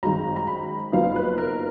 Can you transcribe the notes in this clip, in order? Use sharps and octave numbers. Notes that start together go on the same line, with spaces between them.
G#1 F#2 D#3 G#3 A#5
A#5
B5
F#1 F#2 F3 B3 D#4 F5
B4
A#4